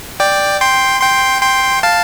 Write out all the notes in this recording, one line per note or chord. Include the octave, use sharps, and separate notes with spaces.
D5 G5
G5 C6
G5 C6
G5 C6
F5 A5